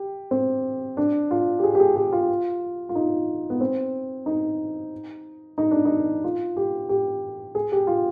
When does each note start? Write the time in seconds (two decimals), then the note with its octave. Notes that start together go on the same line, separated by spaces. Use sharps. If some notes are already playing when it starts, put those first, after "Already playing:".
Already playing: G4
0.31 C4
0.97 D4
1.31 F4
1.59 G4
1.64 G#4
1.75 G4
1.80 G#4
1.96 G4
2.12 F4
2.89 F4
2.95 D#4
3.50 B3
3.61 C4
4.26 D#4
5.58 D#4
5.71 D4
5.85 D#4
6.24 F4
6.57 G4
6.89 G4
7.55 G#4
7.72 G4
7.87 F4